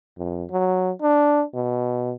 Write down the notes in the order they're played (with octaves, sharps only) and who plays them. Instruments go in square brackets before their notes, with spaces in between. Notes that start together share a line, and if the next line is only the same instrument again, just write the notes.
[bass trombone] F2
F#3
D4
B2